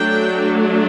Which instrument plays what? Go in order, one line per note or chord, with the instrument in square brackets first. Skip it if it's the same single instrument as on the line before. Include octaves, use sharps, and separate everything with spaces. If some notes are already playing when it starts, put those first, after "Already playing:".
Already playing: [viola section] F#3 A3 D4 G5